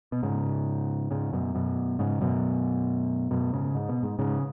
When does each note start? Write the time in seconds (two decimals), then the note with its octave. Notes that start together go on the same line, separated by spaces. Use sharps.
0.12 B2
0.23 G#2 C#3
1.11 G#2 C#3
1.33 F#2 B2
1.55 F#2 B2
1.99 G#2 C#3
2.21 F#2 B2
3.31 F#2 B2
3.53 G#2 C#3
3.75 G#2
3.89 B2
4.03 G#2
4.19 G#2 C#3